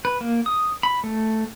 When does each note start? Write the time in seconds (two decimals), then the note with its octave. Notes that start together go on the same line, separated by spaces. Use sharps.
0.05 B4
0.21 A#3
0.46 D#6
0.83 B5
1.04 A3